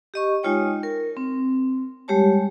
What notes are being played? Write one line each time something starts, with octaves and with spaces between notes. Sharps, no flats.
G4 D#5 C#6
G#3 D#4 F4 C#5 G5
A#4
C4
G3 G#3 G4 C#5 A5